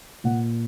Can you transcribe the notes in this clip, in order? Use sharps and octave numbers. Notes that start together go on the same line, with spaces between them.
A#2 F#5